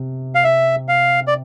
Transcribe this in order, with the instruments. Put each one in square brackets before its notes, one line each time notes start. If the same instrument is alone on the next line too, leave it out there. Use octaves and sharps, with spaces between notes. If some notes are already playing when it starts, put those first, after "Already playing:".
Already playing: [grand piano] C3
[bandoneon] F5
E5
F5
D5